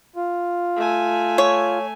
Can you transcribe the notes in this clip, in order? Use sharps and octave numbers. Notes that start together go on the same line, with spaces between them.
F4
A3 G#5
C#5